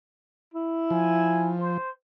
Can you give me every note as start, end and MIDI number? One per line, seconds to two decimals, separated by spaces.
0.54 1.52 64
0.90 1.77 53
0.90 1.54 80
1.60 1.90 72